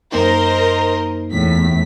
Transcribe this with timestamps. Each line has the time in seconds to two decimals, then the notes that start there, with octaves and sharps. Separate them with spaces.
0.12 F#2 A#3 D#4 A#4 C5 D#5
1.31 E2 A2 B6